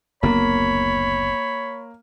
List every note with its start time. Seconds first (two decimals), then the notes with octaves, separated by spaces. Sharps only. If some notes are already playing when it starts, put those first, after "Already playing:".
0.23 F#1 D2 A#3 B3 C#5 B5